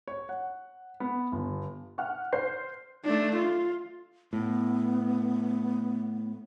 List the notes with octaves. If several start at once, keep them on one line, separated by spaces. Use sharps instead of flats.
C#5
F#5
B3
G1
F#5 F6 F#6
C5 G6 C7
A3 D4
F4
A2 B3